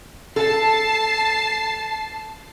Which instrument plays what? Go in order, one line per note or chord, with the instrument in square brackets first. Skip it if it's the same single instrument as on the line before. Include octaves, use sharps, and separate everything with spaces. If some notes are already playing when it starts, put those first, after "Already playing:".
[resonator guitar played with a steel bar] A4 [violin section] A5 C7